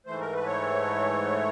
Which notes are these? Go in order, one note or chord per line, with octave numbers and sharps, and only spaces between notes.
G#2 E3 A3 C5
A#4
B4
C#5